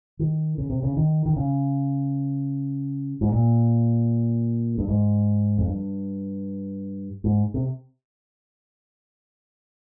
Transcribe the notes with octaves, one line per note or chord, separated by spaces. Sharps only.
D#3
C#3
C3
C#3
D#3
D#3
C#3
G#2
A#2
G2
G#2
F2
G2
G#2
C3